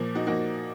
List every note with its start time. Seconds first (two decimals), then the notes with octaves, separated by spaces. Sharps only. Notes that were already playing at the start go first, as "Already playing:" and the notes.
Already playing: A#2 F3 A#3
0.15 D#4 F#4
0.27 A#2 F3 A#3 D#4 F#4